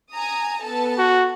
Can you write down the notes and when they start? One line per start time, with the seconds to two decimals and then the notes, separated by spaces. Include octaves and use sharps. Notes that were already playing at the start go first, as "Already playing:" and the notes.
0.13 G#5 A#5 D#6
0.63 B3 A4 A5
0.98 F#4